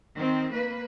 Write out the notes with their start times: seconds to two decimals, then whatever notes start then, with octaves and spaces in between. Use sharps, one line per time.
0.15 D#3 C4
0.52 A#3 B4